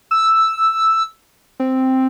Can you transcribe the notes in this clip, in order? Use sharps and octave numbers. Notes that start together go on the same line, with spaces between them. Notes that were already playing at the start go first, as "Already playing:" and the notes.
E6
C4